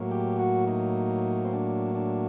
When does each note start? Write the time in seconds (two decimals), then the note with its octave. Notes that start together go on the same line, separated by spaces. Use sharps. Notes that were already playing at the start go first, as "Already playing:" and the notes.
Already playing: A2 F#3 A#3
0.11 G4
0.39 F#4
0.68 D#4
1.45 C4
1.53 D4
1.95 D4